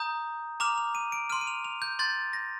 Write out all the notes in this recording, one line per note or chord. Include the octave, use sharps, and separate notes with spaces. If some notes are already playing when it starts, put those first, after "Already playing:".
Already playing: A#5 D#6 G6
A#5 D6 F6 F7
F7
D#7
D7
C6 F6 D#7
D#7
F7
F7
G6
C6 G6 A6
A#6